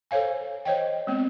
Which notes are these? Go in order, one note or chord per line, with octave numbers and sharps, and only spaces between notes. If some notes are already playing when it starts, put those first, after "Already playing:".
A4 C5 C#5 F5 G#5
C5 C#5 D#5 G5
G#3 B3 C4